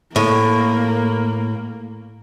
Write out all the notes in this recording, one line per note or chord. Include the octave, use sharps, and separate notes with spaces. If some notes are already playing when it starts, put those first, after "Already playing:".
A2 A#3